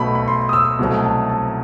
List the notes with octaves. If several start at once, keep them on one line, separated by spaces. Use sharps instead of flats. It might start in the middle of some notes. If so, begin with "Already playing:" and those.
Already playing: B1 B2 A3 B5
B5
C6
D#6
E6
C2 B2 F#3 A3
A5
A5